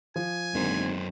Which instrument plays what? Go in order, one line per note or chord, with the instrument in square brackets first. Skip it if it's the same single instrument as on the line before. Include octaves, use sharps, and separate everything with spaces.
[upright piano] F3 [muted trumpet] G#5
[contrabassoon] G#1 [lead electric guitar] F#2 C5 [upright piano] D3 A#3